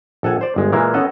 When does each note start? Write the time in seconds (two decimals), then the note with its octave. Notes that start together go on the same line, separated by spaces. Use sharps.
0.23 A#1 A4 F#5 G#5
0.41 C5 D5
0.56 G1 G#3
0.72 A#2 E3 G#3 A#3 A#4
0.94 B3 C#4 A4 D#5 F#5